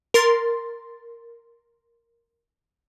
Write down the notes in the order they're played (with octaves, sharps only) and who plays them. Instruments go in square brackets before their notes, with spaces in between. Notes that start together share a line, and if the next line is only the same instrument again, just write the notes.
[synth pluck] A#4 C6 A6